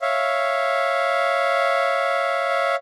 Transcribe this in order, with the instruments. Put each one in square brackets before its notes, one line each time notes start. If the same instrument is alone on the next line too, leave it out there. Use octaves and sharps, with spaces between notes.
[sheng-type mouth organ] C#5 E5 F5